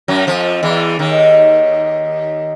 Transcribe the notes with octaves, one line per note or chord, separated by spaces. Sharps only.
F#2 F#3
F2 F3
E2 E3
D#2 D#3